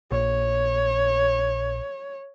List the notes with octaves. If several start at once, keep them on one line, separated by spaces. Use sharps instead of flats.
A#1 C#5